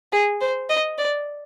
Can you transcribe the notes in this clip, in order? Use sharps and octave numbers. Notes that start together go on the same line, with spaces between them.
G#4
C5
D#5
D5